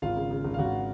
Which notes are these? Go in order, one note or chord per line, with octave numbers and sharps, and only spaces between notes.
G#1 F4 F5
C#3
C#3
G#1
F5
G#1 F#4 F#5